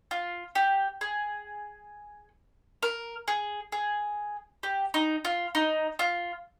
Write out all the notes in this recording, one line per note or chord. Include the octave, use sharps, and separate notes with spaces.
F4
G4
G#4
A#4
G#4
G#4
G4
D#4
F4
D#4
F4